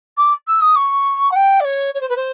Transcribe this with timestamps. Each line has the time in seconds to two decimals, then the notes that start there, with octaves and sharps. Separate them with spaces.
0.17 D6
0.47 E6
0.61 D#6
0.76 C#6
1.31 F#5
1.36 G5
1.60 D5
1.64 C#5
1.94 C#5
2.01 C5
2.09 B4
2.16 C5